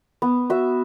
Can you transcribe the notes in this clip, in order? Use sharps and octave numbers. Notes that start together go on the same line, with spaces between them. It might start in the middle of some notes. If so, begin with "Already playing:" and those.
B3
F#4 E5